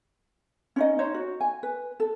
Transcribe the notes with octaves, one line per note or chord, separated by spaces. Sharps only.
C#4 D#4 D#5
D#4 C5 C#5
F#4
G#5
B4
A4